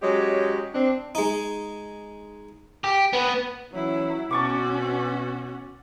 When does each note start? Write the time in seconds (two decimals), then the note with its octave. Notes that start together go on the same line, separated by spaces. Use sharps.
0.02 F#3 G#3 C#4 G4
0.74 C4 D4
1.15 G#3 D#4
2.84 G4
3.13 B3
3.73 E3 F#3 C#4 E4 C#5
4.31 B2 C#4 F#4 A5 C#6 D6